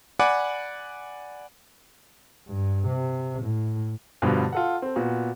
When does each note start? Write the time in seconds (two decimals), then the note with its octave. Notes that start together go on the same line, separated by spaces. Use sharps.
0.19 D5 F#5 G#5 B5 D6
2.49 G2
2.87 C3
3.43 A2
4.22 G2 B2 D3 F3
4.52 F4 A4 F#5
4.82 C4 A4
4.96 A#2 B3 F#4